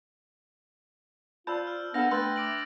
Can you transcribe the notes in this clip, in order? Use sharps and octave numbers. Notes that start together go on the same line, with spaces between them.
F4 C5 D5 A5 B5 E6 G6
F6
B3 D4 A4 B4 F5 E6 A#6
A3 B4 G5 C6 E6 A6
D6 D7 F#7